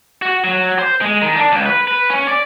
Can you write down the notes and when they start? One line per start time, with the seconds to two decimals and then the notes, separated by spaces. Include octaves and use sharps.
0.22 F#4
0.44 F#3
0.79 C5
1.01 G#3
1.22 D#3
1.36 D4
1.52 C#2
1.66 B4
1.88 B4
2.10 C#4
2.27 D5